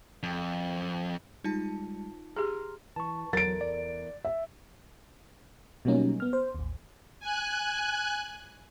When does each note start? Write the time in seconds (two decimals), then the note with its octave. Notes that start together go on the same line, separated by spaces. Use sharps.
0.23 F2
1.44 G3 G#3 D#4 F4 A5
2.36 G4 G#4 A#5 C6 F6
2.96 E3 A5 C#6
3.33 E2 F#3 A4 A#4 A6 D7
3.61 D5
4.25 E5
5.85 B2 F#3 G3 A#3 C#4 D#4
6.20 B3 F6
6.33 C5
6.55 A1 D#2
7.20 G#5 F#6